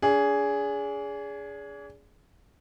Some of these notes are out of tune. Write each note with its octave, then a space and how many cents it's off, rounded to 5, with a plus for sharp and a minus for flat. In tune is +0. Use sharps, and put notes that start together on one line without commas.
D4 -40 G#4 +0